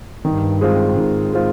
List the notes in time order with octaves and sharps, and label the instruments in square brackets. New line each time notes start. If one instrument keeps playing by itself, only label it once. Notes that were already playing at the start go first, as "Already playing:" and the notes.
[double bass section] G2 [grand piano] D#3
[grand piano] G#3 C4 F4
[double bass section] G#2 [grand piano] D#3
[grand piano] G#3 C4 F4